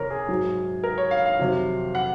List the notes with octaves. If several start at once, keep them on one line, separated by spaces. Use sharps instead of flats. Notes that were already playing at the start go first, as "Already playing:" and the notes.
Already playing: F2 C3 A#4 C#5
G#4
G#2 F#3
A#4
C#5
F5
F5
F2 C3 D#3 F#3
F#5